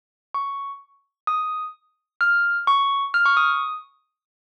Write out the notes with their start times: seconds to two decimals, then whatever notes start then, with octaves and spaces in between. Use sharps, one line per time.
0.34 C#6
1.27 D#6
2.21 F6
2.67 C#6
3.14 F6
3.26 C#6
3.37 D#6